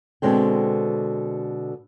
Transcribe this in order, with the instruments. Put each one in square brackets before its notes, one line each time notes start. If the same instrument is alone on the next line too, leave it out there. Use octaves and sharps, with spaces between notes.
[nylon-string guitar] B2 D3 G#3 C4 G5